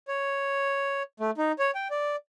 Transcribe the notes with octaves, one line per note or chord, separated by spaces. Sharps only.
C#5
A3
D#4
C#5
G5
D5